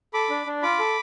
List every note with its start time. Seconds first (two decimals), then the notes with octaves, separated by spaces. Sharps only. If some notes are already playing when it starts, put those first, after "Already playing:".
0.14 A4 B5 D6
0.30 D4
0.46 D4
0.62 F4 B5 D6
0.79 A4